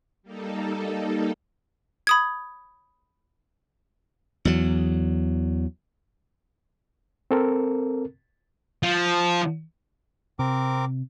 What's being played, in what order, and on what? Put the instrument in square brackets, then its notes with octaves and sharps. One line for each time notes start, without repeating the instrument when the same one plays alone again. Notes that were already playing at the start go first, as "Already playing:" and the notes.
[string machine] G3 A#3 D#4 A4
[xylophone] B5 D#6 G#6
[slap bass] E2 F#3
[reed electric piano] C4 A4 A#4
[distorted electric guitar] F3
[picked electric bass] C3 [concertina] C4 A#4 D6